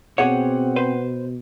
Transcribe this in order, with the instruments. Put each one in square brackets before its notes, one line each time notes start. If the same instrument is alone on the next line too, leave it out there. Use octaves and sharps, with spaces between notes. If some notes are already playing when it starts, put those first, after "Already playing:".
[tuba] B2 [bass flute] C4 [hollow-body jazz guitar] G4 G#4 C#5 [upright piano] F#5
[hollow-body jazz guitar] B4 C5